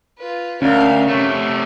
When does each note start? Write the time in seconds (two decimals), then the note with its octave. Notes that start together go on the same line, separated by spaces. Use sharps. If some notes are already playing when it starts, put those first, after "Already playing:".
0.18 F4 B4
0.62 D2 A#3 C#4 F5
1.08 C3 A3 C#5